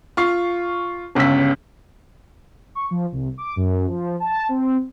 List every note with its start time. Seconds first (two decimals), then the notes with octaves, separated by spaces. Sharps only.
0.17 F4 C#6 C7
1.15 G1 C#2 C#3 E6 B6
2.75 C#6
2.91 F3
3.12 C2
3.38 D6
3.56 F#2
3.87 F3
4.20 A5
4.49 C4